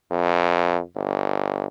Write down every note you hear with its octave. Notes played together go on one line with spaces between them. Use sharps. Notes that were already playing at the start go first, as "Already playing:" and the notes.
F2
G1